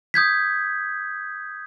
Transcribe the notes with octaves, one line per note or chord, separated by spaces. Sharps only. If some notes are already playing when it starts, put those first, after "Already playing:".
D#6 G6 G#6 B6